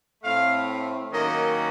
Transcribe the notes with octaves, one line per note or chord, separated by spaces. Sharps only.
A2 A3 C4 F5
D#3 F#3 A#3 C#4 D#5